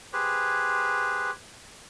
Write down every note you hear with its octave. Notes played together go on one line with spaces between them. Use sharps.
G4 G#4 B4 C5